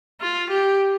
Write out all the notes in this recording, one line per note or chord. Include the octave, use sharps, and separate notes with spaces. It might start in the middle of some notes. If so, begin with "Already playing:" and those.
F4
G4